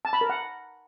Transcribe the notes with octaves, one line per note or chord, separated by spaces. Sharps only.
A5
B5
A#4
F#5